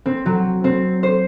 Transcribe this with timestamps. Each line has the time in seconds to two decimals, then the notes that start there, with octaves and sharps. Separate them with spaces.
0.06 C4
0.26 F#3
0.64 C4
1.03 C5